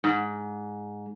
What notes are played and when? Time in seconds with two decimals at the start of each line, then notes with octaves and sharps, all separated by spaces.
0.04 G#2